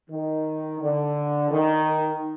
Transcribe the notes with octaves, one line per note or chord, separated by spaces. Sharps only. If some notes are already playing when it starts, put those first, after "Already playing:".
D#3
D3
D#3